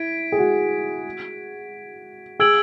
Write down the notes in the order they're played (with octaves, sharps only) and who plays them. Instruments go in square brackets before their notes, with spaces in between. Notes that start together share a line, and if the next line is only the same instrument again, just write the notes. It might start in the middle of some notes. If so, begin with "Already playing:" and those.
Already playing: [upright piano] E4 [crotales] G#6 B6 D7
[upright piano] G#4
F#4
[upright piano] G#4 [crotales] E6 G#6 D7 F#7